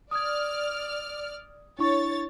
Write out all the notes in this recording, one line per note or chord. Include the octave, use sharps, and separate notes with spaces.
D5 D#6 F6 G#6
D4 E4 C#5 C#6 A6